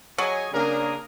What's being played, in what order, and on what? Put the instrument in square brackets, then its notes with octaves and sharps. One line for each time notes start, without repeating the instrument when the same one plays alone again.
[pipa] F#3 [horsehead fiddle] G#4 [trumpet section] C#5 D#5 G#5
[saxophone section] C#3 D4 [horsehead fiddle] A#3 G#4 [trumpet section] A#4